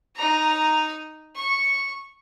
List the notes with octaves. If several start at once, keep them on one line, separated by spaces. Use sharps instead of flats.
D#4 A#5
C#6